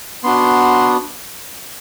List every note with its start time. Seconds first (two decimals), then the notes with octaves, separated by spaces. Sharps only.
0.23 B3 D4 F#4 C6